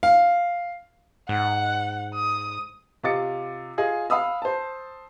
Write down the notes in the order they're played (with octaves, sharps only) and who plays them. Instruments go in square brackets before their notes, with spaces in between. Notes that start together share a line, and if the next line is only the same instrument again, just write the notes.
[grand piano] F5
[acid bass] G#2 [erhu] F#5
[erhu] D#6
[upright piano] C3 F4 D#5 D6 A6 C#7
F4 G#4 D#5
F5 B5 D#6 E6
C5 A5